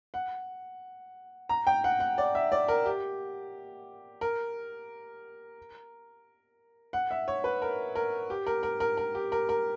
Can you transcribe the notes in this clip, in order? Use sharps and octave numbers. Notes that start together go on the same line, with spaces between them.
F#5
A#5
G5
F#5
F#5
D5
E5
D5
A#4
G4
A#4
F#5
E5
C#5
B4
A#4
A#4
G4
A#4
A#4
A#4
A#4
G4
A#4
A#4